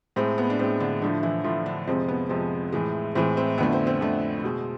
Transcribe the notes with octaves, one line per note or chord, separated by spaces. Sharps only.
A2 G#3 C4
B3
D4
A2 G#3 C4
D3 D4
A2 D3 F3 A3 D4
E3 E4
A2 F3 A3 F4
D3 D4
F2 C3 F3 G#3 C4
B3
F2 C3 F3 G#3 C4
A2 E3 G#3
A2 E3 G#3 C4
C4
F2 D3 A3 B3
C4
C4
F2 D3 A3
B2 G#3